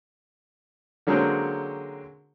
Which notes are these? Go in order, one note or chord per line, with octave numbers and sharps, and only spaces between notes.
D3 F#3 G#3 A#3 C4 C#4